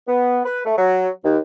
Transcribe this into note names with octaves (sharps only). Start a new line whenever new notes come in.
B3
B4
A3
F#3
D#2